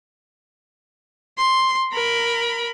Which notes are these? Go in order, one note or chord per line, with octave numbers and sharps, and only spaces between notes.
C6
A#4 B5